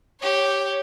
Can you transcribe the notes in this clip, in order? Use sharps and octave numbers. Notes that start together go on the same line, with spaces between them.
G4 C#5